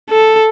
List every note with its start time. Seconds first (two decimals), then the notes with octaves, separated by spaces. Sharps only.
0.10 A4